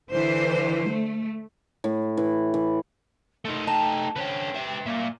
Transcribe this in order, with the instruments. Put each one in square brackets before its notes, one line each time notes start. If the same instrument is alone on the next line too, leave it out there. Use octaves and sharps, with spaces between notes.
[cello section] D3 E3 C5
A3
[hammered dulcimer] A2
E3
E3
[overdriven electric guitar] A3 D#4 [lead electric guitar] A4 A#4 [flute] C6
[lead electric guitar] D#5 A#5 [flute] G5 [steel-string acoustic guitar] A5
[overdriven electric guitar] D3 C#4 [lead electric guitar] B4 G5 [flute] C5
[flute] A4 [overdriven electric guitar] C5 E5
[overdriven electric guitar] A#2 [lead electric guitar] F#3 E5 [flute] F5